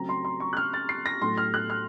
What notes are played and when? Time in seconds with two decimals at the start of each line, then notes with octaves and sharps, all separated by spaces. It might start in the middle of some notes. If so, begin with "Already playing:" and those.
Already playing: C#3 F#3 A3 C4 A#5
0.09 C6
0.25 C6
0.40 C#6
0.53 F#6
0.57 F6
0.74 A6
0.89 C7
1.06 A#6
1.22 A2 F#3 A3 C6
1.37 F6
1.54 F#6
1.70 F6